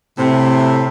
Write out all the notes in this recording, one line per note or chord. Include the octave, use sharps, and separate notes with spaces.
A2 C3